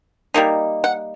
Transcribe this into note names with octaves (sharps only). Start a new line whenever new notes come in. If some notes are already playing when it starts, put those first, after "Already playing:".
G3 A#3 D#4
F#5